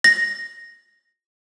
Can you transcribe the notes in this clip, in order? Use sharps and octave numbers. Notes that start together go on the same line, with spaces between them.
A#6